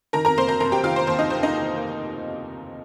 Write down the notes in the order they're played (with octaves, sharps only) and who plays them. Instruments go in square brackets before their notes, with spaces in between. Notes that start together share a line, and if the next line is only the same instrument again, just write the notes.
[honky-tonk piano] D#3 A#4 A#5
A#4 A#5
A#3 C5 C6
A#4 A#5
F1 A#4 A#5
G4 G5
D#3 F4 F5
C5
D#2 C5
D#4 D#5
F1 C5
D#4 D#5
F1
A#3